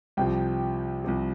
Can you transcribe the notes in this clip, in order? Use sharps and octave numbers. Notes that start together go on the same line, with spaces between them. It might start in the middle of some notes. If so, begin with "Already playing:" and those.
C2 C3 F3 G5
C2 C3 F3